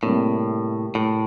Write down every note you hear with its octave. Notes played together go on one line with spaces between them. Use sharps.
A2 C3 G3 A#3
A2